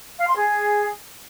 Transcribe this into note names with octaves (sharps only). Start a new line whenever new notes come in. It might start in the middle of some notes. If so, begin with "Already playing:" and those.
F5
C6
G#4